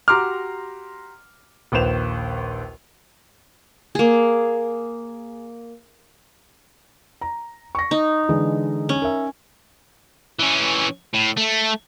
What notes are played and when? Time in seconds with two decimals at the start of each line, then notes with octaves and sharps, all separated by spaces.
0.08 F#4 G4 A#5 C6 D6 F6
1.72 A#1 D#2 B4 C5 E7 F7
3.95 A#3 G#4
7.21 A#5
7.75 C#6 A#6
7.91 D#4
8.29 D3 E3 G#3
8.89 C#4
9.02 A#4 E5
10.40 E3 C#4
11.14 A2
11.37 A3